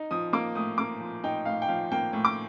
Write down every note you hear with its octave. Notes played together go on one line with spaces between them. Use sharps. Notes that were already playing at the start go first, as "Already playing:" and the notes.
Already playing: D#4
F3 D#6
A#3 D6
A2 D#6
A#3 D6
F3
D#4 G5
A2 F5
G5
F3 F5
A#3 G5
A2
D6